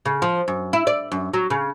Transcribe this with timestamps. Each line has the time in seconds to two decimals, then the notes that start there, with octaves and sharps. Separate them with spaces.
0.06 C#3
0.22 F3
0.48 F#2
0.73 E4
0.87 D5
1.12 F#2
1.34 F#3
1.50 C#3